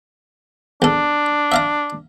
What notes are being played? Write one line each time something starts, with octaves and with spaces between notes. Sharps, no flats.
E2 D4 A4
E5 F5 A#5